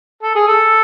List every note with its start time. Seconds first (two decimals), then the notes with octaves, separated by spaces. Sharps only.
0.23 A4
0.35 G#4
0.48 A4